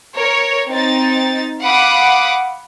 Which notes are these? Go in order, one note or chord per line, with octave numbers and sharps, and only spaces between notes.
A#4 C#5
C4 D#4 A6
F5 F#5 B5 D6 D#6